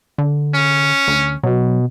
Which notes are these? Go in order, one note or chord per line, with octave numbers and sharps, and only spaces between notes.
D3
C#4
D2
B2 F#3